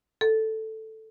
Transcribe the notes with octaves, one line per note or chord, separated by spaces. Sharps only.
A4